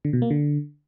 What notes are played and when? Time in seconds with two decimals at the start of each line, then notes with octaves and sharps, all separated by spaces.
0.05 D3
0.13 B2
0.22 A#3
0.31 D3